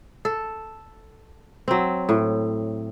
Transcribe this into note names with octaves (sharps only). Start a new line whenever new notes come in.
A4
F#3 C4
A2